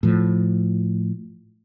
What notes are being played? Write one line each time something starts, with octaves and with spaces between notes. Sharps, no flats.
A2 F3